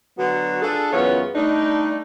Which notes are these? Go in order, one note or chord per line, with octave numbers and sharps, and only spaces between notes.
D3 F#3 B3 F#4
D4 F4 G#4 A4
F#2 C#3 E3 B3 F4 C#5
G3 A3 D4 D#4